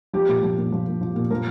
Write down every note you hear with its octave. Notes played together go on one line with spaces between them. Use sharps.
F3 G4
A#2
F3
A#2
F3
A#2
F3
A#2
F3 A#4